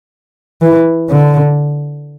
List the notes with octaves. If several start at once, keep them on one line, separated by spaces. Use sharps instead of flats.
E3
D3